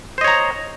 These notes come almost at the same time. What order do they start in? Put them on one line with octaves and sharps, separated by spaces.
C5 D#5 C#5 A#5